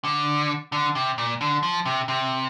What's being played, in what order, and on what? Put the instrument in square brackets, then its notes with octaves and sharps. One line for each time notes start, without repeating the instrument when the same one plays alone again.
[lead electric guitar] D3
D3
C3
A#2
D3
F3
C3
C3